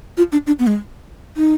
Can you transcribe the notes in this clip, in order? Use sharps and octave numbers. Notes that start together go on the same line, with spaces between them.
F4
D4
D4
B3
G#3
D#4